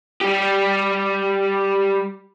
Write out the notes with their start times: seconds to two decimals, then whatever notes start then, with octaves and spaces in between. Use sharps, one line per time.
0.21 G3 G4